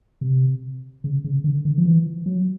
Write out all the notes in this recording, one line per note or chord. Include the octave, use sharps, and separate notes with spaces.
C3
C#3
C#3
D3
D3
F3
E3
F#3